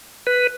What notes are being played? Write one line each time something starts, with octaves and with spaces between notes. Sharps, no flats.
B4